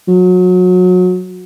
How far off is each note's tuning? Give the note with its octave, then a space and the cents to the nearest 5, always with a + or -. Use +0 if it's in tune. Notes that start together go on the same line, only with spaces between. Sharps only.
F#3 -25